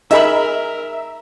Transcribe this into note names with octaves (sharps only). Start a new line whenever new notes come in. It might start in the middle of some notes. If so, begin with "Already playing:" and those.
D#4 G#4 A#4 D#5 E5 B5